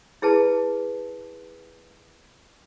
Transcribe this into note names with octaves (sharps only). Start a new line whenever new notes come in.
E4 G#4 B4 A5